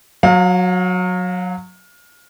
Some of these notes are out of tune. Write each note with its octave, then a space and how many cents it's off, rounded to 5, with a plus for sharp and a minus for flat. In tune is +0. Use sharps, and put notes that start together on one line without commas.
F#3 -15 F5 +30